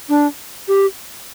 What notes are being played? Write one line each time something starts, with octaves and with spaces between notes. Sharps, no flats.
D4
G4